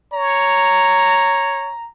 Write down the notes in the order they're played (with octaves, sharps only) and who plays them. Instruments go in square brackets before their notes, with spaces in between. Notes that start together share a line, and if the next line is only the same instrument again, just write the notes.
[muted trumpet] C#5 [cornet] A#5